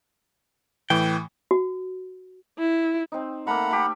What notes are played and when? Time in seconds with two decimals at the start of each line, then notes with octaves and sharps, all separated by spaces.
0.90 A2 E3 G5
1.51 F#4
2.59 E4
3.12 C4 D#4
3.47 A3 A#3 F#5 A#5 B5
3.71 A3 G4